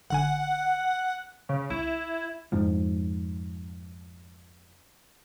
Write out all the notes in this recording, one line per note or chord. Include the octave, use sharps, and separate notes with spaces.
G1 D3 F#5 G#5
C#3
C2 E4
F2 G#2 F3